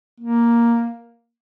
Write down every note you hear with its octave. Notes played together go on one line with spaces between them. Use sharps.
A#3